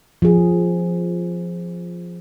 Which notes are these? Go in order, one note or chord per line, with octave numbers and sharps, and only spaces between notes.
F3 G#4